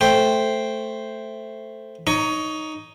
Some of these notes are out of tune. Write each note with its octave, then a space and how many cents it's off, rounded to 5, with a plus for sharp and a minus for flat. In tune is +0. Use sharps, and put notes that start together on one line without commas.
A3 +0 C5 +0 G5 +0
D#4 +0 C#5 +20 A#5 +5